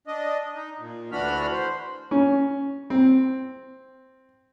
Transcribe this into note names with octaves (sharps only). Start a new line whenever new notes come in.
D4 D#5
D#4
A#2
D2 E3 D4 F#4 B5 F6
C5
C#4
C4